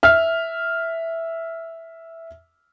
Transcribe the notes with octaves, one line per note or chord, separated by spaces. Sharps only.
E5 F6